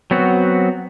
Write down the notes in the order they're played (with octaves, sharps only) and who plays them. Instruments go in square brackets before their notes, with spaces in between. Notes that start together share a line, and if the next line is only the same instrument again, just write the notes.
[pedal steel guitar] F#3 B3 C4 F#4